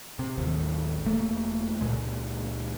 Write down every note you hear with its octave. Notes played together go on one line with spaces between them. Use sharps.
C3
A1 D#2
E1 A3 A#3
C#2 A#2 G#3